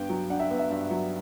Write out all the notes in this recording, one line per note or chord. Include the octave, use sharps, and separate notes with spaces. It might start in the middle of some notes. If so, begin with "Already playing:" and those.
Already playing: G2 B3 D4 G5
F#3
D4 F#5
E5
B3
E5
G2
F#3